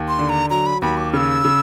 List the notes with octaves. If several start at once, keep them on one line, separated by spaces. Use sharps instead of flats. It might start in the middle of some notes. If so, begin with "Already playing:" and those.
Already playing: D#2
C6
D3
A#5
F#3 A#5
B5
D#2 B5
D6
C#3 E6 F6
C#3